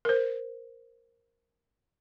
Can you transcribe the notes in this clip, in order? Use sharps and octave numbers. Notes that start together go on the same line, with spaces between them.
A#4 C5